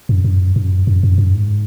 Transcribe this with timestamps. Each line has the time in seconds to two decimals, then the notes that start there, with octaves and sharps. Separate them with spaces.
0.09 F#2
0.24 F#2
0.56 F#2
0.87 F#2
1.03 F#2
1.18 F#2
1.34 G#2